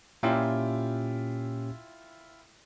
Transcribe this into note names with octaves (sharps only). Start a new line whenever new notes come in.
A#2 C#4 E4 F4 G4 G5